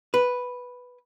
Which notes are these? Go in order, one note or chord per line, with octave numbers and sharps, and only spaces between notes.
B4